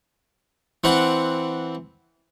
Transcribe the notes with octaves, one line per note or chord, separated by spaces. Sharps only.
E3 C4 F#5